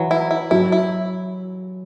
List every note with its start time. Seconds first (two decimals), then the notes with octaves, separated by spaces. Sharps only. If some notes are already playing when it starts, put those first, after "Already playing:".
Already playing: E3 F#3
0.11 E4
0.31 E4
0.51 F#3 E4
0.72 E4